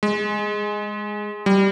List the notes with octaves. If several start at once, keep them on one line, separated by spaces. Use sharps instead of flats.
G#3
G3